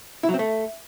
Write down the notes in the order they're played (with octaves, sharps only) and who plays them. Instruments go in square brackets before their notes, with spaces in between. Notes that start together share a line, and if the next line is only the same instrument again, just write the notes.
[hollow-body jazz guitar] E4
F#3
C4
A3